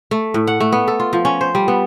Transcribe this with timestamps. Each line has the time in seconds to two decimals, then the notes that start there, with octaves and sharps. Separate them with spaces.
0.11 A3
0.34 A2
0.47 F#5
0.60 A3
0.72 B3
0.88 A4
1.00 F4
1.13 F3
1.25 C#4
1.41 C5
1.55 G3
1.68 B3